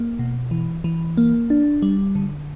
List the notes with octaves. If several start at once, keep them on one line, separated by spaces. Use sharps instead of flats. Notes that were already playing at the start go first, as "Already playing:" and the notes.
Already playing: A#3
B2
E3
E3
A#3
D4
G3
D3